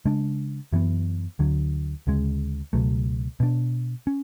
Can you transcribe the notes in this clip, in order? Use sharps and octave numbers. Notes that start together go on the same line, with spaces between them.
C#3 G#3 D4
F#2 E3 B3
D2 D3 F#3
D2 C#3 G#3
C#2 B2 F#3 A3
B2 G#3 D4
C#4